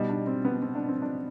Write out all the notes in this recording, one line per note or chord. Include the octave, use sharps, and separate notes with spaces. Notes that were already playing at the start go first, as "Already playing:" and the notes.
Already playing: B2 G3 D#4
D4
C4
B3
C4
D4
C4
D4